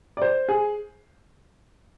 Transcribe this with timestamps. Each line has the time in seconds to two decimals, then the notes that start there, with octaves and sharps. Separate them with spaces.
0.17 D5
0.22 C5
0.49 G#4